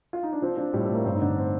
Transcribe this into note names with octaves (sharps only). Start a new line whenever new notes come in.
F4
D#4
D4
F3 C4
F3 D4
A2 G3
A3
A2
A#3
G2 C4
D#4
D3 D4
C4